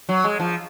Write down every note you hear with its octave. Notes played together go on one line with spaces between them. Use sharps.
F#3
G#3
F3